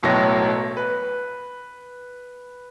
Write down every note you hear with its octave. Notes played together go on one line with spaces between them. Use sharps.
E1 B1 A2 F#3 A#6
B4